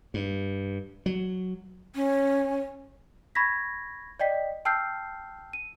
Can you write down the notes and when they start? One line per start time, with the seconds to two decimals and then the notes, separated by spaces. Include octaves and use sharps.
0.14 G2
1.06 F#3
1.95 C#4
3.35 B5 C#6 G#6 A#6 B6
4.20 D5 D#5 G5 B6
4.65 G5 A5 E6 F6 G6 C7
5.53 D#7